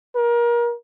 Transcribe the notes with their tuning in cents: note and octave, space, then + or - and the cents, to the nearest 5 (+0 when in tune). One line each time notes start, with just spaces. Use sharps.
A#4 +30